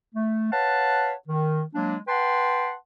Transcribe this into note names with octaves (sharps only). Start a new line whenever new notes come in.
A3
B4 C#5 F5 F#5 A5
D#3
F#3 G#3 A#3 D4
B4 F#5 G5 A5 C6